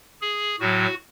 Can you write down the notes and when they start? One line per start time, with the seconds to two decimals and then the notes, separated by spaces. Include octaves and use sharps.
0.21 G#4
0.60 A2 F#3 F#4